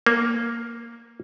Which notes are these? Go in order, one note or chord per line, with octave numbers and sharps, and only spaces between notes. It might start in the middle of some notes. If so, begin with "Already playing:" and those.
A#3